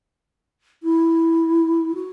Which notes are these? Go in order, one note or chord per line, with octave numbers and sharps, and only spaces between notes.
E4
F#4